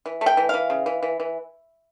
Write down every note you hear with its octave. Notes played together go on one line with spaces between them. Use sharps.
E3
A3
G5
E3
E3 F5
C#3
E3
E3
E3